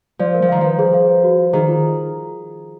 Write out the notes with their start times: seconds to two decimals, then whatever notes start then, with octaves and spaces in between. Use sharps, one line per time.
0.19 F3 D5
0.34 A#4
0.42 F3
0.49 D#3 F5
0.61 F3 B4
0.79 G#4
0.94 F5
1.09 B4
1.23 F#4
1.39 F5
1.53 D#3 G#4
1.68 F4